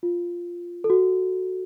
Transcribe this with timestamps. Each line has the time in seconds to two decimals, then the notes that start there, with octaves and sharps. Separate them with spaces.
0.03 F4
0.84 A4
0.90 F#4